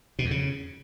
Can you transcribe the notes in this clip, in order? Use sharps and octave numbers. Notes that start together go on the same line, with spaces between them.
B2
F2
C#3